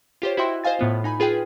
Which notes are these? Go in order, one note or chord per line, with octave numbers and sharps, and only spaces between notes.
F4 G4 C5 C#5
E4 F#4 D#5 E5 G5 C6
C5 D#5 F5 G#5 A6
A2 B3 F4
D#4 G#5 B5
F4 G#4 B4 G5